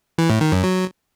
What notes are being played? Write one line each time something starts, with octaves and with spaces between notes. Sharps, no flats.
E3
A2
D#3
F#2
F#3